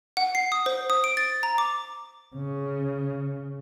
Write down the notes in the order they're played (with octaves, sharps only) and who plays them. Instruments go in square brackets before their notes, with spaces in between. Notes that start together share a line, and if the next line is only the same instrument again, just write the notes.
[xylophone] F#5
C7
D#6
C5
D#6
D7
A6
A#5
D6
[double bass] C#3